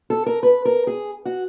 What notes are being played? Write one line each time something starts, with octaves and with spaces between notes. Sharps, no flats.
A4
A#4
B4
A#4
G#4
F#4